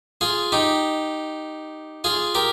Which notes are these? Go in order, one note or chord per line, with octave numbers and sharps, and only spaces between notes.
F4 G#4
D#4 G4
F4 G#4
G4 A#4